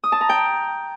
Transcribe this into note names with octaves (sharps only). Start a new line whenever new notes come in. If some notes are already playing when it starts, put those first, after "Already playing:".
D#6
A5
A#5
G5